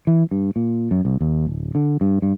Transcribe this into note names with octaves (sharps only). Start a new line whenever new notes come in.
E3
G2
A#2
F#2
C2
D#2
D1
D3
G2
G2